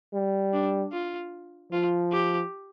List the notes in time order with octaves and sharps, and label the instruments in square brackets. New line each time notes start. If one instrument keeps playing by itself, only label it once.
[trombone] G3
[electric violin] D4
F4
[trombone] F3 [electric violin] F4
[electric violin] G4